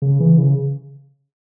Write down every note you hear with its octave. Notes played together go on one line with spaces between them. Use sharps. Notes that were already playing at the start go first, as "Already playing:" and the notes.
C#3
E3
C#3